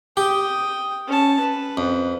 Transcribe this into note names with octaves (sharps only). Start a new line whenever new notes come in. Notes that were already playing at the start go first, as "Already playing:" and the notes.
G4 G5 D#6
C#4 A5
B4
F2